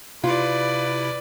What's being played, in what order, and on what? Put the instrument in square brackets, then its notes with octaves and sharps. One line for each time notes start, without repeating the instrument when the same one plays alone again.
[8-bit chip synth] C3 E4 [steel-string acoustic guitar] F4 [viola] B4 D5